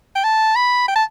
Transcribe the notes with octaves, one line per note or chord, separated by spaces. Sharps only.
G5
A5
B5
G5
A5